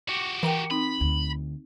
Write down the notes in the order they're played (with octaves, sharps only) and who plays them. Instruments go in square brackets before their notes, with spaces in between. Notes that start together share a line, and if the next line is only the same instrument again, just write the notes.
[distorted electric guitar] F#4 G4
[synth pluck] E3 A#5 D#7 [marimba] A#4 G5
[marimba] C4 D#4 [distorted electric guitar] B5
[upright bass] D2